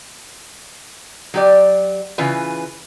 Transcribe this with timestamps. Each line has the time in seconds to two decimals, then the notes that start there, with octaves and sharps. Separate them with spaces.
1.34 F#3 G4 D5
2.18 C#3 E3 F4 B4